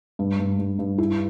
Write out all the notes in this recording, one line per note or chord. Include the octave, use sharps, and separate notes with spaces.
G2
G2
G2
G2
E4